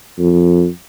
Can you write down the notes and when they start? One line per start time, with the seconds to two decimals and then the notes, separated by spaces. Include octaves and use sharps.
0.19 F2